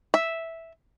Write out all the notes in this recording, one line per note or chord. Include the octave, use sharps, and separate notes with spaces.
E5